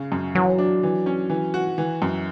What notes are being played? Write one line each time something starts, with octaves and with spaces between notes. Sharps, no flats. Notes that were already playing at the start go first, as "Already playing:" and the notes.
Already playing: C#3
F#2
E3 F#3
D4
E3
C#4
E3
F#4
E3
F#2